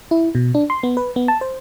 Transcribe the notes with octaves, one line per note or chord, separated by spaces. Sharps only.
E4
B2
D4
C6
B3
B4
B3
A5
C5